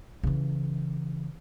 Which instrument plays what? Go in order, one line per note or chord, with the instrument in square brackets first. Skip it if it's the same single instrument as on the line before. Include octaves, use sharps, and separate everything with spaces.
[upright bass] C#3 E3